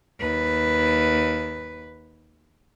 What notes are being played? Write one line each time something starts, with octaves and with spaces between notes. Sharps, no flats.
D#2 B4